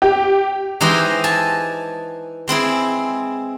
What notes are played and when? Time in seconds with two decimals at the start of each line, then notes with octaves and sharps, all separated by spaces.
0.02 G4
0.81 E3 G#3 D#4 G4 C5 D#5
1.24 G#5 A5
2.48 G#3 C4 E4 G#4